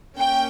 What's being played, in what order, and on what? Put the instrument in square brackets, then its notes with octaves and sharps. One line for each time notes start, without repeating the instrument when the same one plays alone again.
[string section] A#3 C#4 G5